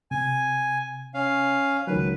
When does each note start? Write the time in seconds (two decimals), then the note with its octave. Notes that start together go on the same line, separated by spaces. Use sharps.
0.11 C3 G#5
1.14 C#4 F5
1.87 C#2 D#3 F#3 B4